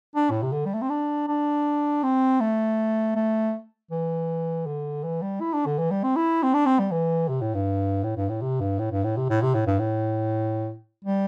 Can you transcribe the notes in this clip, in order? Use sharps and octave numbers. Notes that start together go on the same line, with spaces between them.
D4
A2
C3
D3
G3
A3
C4
D4
D4
C4
A3
A3
E3
D3
E3
G3
E4
D4
D3
E3
G3
C4
E4
C4
D4
C4
G3
E3
C3
A2
G2
A2
G2
A2
C3
G2
A2
G2
A2
C3
A2
C3
A2
G2
A2
G3